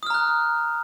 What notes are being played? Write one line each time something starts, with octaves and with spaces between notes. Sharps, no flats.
A#5 D#6 F6 F#6